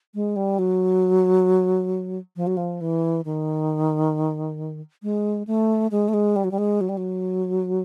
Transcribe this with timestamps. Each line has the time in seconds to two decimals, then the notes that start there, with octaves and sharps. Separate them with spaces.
0.15 G#3
0.36 G3
0.59 F#3
2.36 F3
2.47 F#3
2.57 F3
2.81 E3
3.25 D#3
5.03 G#3
5.47 A3
5.91 G#3
6.08 A3
6.14 G#3
6.36 G3
6.44 F#3
6.51 G3
6.58 G#3
6.81 F#3
6.89 G3
6.97 F#3